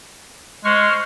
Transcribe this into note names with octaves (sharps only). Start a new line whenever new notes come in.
G#3 C5 C#6 F6